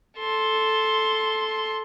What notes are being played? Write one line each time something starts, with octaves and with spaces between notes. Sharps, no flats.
A4 C6